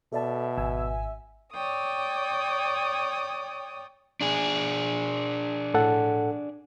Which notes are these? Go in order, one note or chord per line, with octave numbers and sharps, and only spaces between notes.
B2 A4 D5 E5 A5
G#1 G#5 E6
C#5 D5 G5 D#6
D4 G#4
A2 A4 F#5